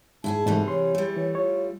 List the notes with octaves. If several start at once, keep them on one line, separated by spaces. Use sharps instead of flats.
G#2 E4 F#4 G#4 A5
G#2 C3 E3 G3 A3
C#5 C6
G3 A3
E3 C#5
F4 C#5